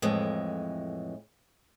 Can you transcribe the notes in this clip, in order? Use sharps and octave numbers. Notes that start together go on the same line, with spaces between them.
F2 A2 E3 G#3